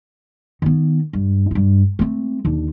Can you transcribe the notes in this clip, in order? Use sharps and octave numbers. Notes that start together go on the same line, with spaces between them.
D#3 B3
G2
G2 E4
A3 C4
D#2 D3